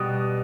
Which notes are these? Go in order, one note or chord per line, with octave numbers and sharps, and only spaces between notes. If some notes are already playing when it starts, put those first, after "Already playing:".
Already playing: B2 G3 D#6 F#6